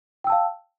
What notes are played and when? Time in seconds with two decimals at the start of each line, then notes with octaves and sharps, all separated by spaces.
0.24 G5
0.27 E6
0.30 A5
0.32 F5